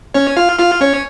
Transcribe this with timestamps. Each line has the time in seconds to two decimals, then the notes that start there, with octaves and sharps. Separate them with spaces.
0.14 C#4 C#5
0.37 F4 F5
0.59 F4 F5
0.81 C#4 C#5